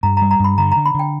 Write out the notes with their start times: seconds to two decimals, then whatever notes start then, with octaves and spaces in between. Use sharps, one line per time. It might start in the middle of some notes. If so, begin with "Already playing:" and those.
0.03 G2 A#5
0.17 A#5
0.22 G3
0.31 A#5
0.40 G2 B5
0.58 D3 A#5
0.72 A#5
0.76 D3
0.86 B5
0.94 D3 G5